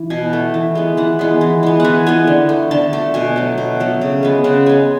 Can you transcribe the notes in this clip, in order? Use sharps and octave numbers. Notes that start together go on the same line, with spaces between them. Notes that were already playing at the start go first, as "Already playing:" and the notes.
Already playing: E3
B2 G#5
A3
E3
G#3 B3
E3 F#5
G#3 B3
E3
G#3 B3
E3 F#5 G#5
G#3 B3 G#5
D3
A3
D3 A5
A3
B2 G#5
F#3 A3
B2
F#3 A3
C#3
G#3 B3
C#3 F#5
G#3 B3 G#5